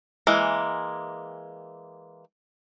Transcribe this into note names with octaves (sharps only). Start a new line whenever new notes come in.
E3 G#3 A#3